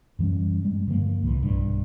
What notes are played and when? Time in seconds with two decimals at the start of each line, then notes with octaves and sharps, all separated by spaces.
0.19 F#2 E3 G3 C#4
0.64 G2 G3 G#3
0.87 G2 D3 F3 A#3
1.23 C2 A2 E3
1.43 B1 G2